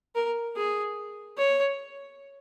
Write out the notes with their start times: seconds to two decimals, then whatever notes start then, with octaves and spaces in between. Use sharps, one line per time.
0.15 A#4
0.57 G#4
1.37 C#5